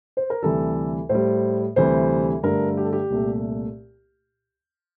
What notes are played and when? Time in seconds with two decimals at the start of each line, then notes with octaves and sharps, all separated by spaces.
0.17 C5
0.30 A#4
0.43 D2 C3 E3 G3 A4
1.09 A2 C5
1.15 G3
1.76 D2 C3 E3 G3 C5
2.43 G2 D3 A3 A#4
2.77 G4
2.85 A4
2.93 G4
3.10 C2 A#2 A3